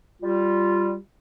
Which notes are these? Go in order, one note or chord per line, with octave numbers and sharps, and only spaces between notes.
G3 F4